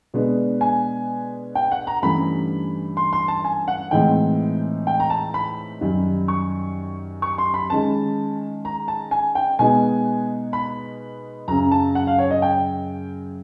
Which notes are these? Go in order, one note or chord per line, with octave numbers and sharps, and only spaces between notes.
B2 G#3 B3 D4
G#5
G5
F#5
A#5
G2 E3 A3 C#4 B5
C6
C6
A5
G#5
F#5
A2 E3 G#3 C4 D#4 G5
G5
A#5
A5
B5
F#2 D#3 G3
C#6
C#6
C6
B5
D#3 G#3 C#4 A5
A#5
A5
G#5
G5
B2 G#3 B3 D#4 G#5
B5
F#2 C#3 F#3 A#5
A5
F#5
F5
C#5
D#5
G5